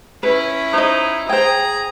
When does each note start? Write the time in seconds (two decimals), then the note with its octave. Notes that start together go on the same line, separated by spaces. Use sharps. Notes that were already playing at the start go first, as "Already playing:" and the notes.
0.23 C#4 E4 B4
0.73 D#4 C5 D#5
1.29 G#4 C5 G5 A#5